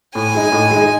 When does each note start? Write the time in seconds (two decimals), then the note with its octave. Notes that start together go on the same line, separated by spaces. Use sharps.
0.15 A2 G#5
0.35 G#3 D#4
0.52 A2
0.71 G#3
0.76 D#4